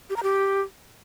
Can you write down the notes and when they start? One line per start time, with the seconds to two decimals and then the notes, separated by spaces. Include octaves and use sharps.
0.10 G4
0.16 A#5
0.23 G4